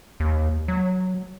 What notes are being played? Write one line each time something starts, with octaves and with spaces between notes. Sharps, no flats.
D#2
F#3